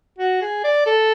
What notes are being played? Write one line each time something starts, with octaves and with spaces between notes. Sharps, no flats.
F#4
G#4
D5
A4